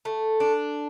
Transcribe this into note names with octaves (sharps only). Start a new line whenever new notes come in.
A3
D4